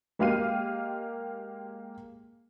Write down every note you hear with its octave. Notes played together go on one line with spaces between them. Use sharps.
G#3 A#3 G4 F5 C7 D#7